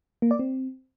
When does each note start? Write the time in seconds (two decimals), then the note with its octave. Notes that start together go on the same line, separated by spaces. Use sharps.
0.22 A#3
0.31 D5
0.39 C4